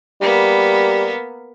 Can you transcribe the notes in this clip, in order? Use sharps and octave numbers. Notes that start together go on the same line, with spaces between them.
G3 A#3 B3